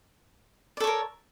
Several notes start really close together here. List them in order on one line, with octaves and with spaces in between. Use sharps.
D5 A4 C#5 A#4